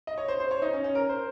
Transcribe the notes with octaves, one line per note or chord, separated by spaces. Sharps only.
D#5
C#5
C5
C5
C#5
D#4
C#4
C#4
A#4
C5